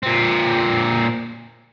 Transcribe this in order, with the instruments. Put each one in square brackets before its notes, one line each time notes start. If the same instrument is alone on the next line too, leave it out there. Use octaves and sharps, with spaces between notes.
[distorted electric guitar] A#2 C4